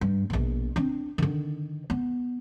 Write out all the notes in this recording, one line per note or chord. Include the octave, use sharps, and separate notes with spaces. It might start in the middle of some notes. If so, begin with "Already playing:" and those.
G2
A#1 B2
C4 D4
D3 D#3
B3